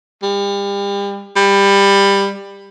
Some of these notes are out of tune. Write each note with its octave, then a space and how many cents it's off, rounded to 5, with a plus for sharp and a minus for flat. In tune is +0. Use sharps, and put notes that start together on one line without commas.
G3 +35
G3 +20